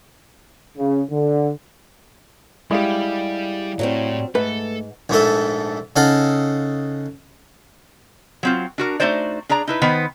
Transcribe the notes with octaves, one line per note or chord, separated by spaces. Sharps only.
C#3
D3
G3 G#3 E4 G4 D5 F5
A2 F#3 G3 C4
G#2 A3 A4 B4
A#1 G#2 A3 A4
C#3 D#4 A4 F5 F#5
F#3 C4 F4
D4 F#4 A#4
A3 C#4 D#4 F#4 C5 D5
D4 G#4 D5 A#5
D#4 E4 B4
D#3 B3 B4 C5